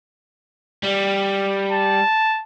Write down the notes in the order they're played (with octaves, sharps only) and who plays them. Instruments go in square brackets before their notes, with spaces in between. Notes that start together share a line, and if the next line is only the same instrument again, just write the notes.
[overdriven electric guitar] G3
[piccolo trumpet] A5